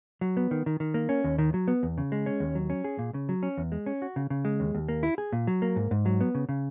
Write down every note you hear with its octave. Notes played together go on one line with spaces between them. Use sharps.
F#3
B3
D#3
D#3
D#3
A#3
C#4
D#2
D#3
F#3
B3
E2
C#3
G#3
C#4
D#2
F#3
C#4
G#4
A#2
C#3
F#3
C#4
E2
G#3
C#4
F#4
C#3
C#3
G#3
D#2
D#2
A#3
E4
G#4
A#2
F#3
A#3
G#2
G#2
F#3
B3
C#3
C#3